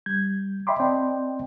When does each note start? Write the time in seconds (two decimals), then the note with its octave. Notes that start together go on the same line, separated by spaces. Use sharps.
0.06 G3 G6 G#6
0.67 D#5 E5 G5 B5 C6 D6
0.80 C4 D5 D#5 G5 A5 C6